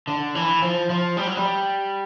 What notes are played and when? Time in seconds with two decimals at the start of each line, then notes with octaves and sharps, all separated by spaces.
0.07 D3
0.35 E3
0.62 F3
0.90 F3
1.17 G3
1.27 F#3
1.37 G3